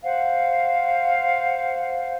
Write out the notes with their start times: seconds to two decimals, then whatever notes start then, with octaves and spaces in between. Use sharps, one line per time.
0.03 C5 F5 F#5